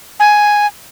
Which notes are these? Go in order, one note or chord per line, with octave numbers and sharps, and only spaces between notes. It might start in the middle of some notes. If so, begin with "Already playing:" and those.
G#5